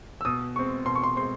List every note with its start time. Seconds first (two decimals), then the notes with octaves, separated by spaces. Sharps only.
0.21 E6
0.25 B2 D#6
0.56 G#3 C4 C#6
0.86 B2 C6
0.95 C#6
1.03 C6
1.16 G#3 C4 C6